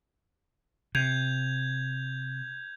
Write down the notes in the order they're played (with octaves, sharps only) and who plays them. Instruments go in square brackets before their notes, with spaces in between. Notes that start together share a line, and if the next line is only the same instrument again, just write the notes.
[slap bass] C3 [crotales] G6 G#6 F7